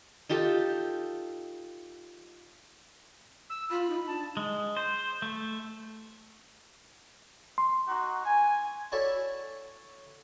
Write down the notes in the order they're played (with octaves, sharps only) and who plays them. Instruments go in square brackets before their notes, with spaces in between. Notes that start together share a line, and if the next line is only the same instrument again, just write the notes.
[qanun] D#4 F4 G4 A4
[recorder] E6
[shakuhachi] F4 [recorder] B5
[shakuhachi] D#4
[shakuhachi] D4 [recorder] A5
[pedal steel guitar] G#3
C5
A3
[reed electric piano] C6
[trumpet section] D#4 F#4
G#5
[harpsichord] E4 F#4 A4 C#5 D5 E5